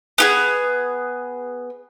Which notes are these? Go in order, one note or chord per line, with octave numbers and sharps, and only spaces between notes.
B3 G4 G#4